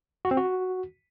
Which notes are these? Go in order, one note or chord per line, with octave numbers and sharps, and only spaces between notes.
F#4
C4
F#4